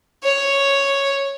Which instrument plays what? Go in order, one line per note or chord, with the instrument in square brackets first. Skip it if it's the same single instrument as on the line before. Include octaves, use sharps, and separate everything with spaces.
[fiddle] C#5